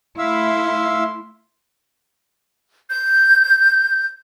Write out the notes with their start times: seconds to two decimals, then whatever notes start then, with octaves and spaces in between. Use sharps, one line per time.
0.18 A3 E4 E5 F5 C6 E6
2.90 G6